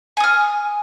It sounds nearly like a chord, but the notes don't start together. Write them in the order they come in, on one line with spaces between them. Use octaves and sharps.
G#5 D#6 F6